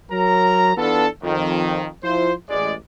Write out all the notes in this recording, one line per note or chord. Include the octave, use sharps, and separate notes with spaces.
F#3 A#4 A#5
E3 B3 D4 F4 A4
F2 D#3
F3 E4 F4 C5
A1 G#3 D5